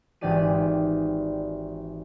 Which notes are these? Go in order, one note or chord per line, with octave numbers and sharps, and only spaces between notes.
G#1 G#2 E3 G4 D5 D#7